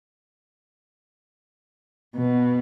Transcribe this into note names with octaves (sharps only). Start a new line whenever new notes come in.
B2